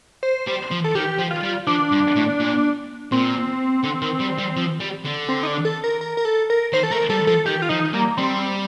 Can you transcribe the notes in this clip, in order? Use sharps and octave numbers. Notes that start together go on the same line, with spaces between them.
C5
G3
F3
A4
D#3 G4
F3
F4
G3
F3 D4
G2
A2
A#2
A#2 C4
D3
D#3
G3
G3
F3
G3
D3
C4
D#4
D4
A4
A#4
A#4
A#4
A4
A#4
D#3 C5
A4
A3 A#4
G3 A4
F3 A4
D#3 G4
F4
F3 D#4
G3 A#3
G3 C4